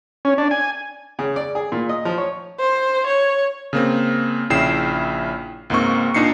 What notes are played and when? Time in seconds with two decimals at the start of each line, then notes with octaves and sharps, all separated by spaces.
0.25 C#4
0.38 D4
0.51 G#5
1.19 C#3
1.36 D5
1.55 G#4
1.72 A#2
1.89 D#5
2.05 F3
2.18 C#5
2.60 C5
3.06 C#5
3.73 C#3 A#3 C4
4.50 A#1 C#3 E4 G5 C7 E7
5.70 C#2 G#2 A#3 C4 C#6
6.14 A#2 D4 D#4 C7 C#7